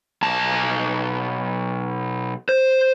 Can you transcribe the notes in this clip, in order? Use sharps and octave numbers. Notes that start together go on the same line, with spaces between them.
B1 A5
C5